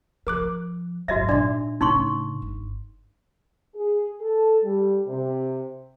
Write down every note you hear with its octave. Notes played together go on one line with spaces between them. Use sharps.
F3 A#4 D6 F#6
G#1 F#3 F#4 D#5 E5
A#2 D4 D#4 D5 E5 C6
A2 C#3 C#4 D#4 C6 C#6
G1
G#4
A4
G3
C3